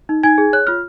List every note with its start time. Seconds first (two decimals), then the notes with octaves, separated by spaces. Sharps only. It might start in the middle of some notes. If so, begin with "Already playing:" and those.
0.09 D#4
0.23 D#4 G#5 G#6
0.38 G#4
0.53 C#5 F#6
0.67 F4 F6